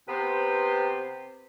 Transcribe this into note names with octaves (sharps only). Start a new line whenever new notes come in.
C3 B3 B4 C5